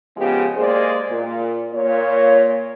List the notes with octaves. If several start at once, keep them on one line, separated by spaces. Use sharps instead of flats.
C#3 F3 G#3 B3 G4
G#3 A#3 G#4 C5 D5
A#2
A#2 C#5